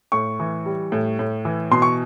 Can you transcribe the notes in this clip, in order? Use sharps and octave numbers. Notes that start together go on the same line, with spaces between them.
A2 C#6
E3
G3
A2
A2
E3
B2 C6
C#6